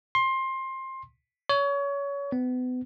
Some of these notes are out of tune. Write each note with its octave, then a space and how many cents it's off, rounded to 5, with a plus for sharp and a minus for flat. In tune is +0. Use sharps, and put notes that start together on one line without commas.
C6 +20
C#5 +25
B3 +35